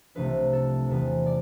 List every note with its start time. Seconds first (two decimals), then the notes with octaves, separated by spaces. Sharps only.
0.15 C2 C3 F3 A3 D4 B4
0.53 A4
0.87 E2 C3 F3 B4
1.26 D5